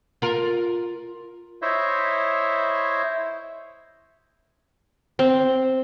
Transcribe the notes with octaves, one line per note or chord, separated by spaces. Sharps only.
F4 A#4
E4 C5 C#5 D#5 E5
C4